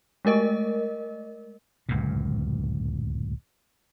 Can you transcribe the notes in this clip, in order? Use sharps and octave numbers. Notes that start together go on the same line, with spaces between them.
G#3 A3 A#4 D#5
D1 C#2 F#2 A#2